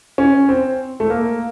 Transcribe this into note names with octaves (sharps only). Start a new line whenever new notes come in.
C#4
C4
A3
A#3